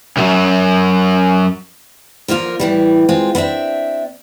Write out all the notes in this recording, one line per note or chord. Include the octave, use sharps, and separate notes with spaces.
C#2 F#2
D3 F3 A#3 F4 A#4
A2 E3 G3
G#3 C4 F4
B3 C4 D4 E5 G5